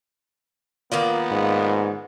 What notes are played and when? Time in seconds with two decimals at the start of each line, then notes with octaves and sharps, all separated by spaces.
0.92 D#3 A#3 B3 F4 D5 F5
1.31 G#2